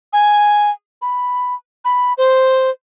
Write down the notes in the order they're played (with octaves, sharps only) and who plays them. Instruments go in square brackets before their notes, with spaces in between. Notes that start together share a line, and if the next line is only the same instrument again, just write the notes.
[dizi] G#5
B5
B5
C5